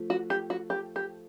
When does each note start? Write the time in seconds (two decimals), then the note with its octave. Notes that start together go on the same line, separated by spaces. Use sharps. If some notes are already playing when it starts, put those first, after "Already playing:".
Already playing: F3 A3
0.10 F#4
0.30 G4
0.50 F#4
0.70 G4
0.96 G4